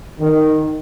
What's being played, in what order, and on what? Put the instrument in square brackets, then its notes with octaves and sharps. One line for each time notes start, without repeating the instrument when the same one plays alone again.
[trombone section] D#3